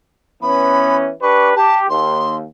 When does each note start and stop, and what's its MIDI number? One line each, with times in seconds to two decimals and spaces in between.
0.42 1.11 52
0.42 1.11 59
0.42 1.11 61
0.42 0.96 83
1.22 1.54 62
1.22 1.54 67
1.22 1.54 71
1.22 1.50 85
1.56 1.89 67
1.56 1.77 81
1.90 2.43 39
1.90 2.36 84